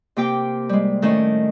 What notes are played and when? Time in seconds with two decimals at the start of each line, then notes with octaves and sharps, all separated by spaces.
0.16 C3 A#3 G4 G5 D6
0.69 G3 G#3
1.02 A2 D#3 A3 C#4 D#5